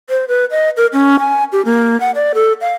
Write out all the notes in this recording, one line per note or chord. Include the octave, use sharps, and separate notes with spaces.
C5
B4
D#5
A#4
C#4
G#5
G4
A#3
F#5
D5
A4
F5